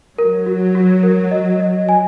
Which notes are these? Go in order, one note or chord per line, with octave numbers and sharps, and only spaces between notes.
F#3 A#4
F#4
F#4
A#4
D#5
D#5
G#5